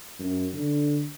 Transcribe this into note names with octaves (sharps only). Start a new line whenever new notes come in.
F#2
D3